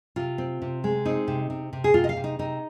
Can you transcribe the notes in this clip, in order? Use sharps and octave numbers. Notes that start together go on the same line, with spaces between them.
C3 F4
C4
C3
G#3
C4 D#4
C3
C3
C3
G#4
C3 F4
D#5
F5
C3
D#4
C3 D#4